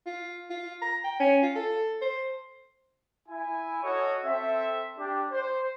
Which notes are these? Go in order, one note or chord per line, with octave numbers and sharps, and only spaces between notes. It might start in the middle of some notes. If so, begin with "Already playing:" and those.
F4
F4
A#5
G5
C#4
F4
A4
C5
E4 G#5
F#4 A4 C#5 D#5
C4 A4 E5
D4 G4
C5